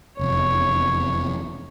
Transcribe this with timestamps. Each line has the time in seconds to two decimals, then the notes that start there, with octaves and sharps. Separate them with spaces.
0.19 F1 E2 C#5